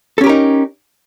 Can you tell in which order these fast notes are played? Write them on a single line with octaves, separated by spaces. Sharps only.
A4 C#4 G4 A#4 D#4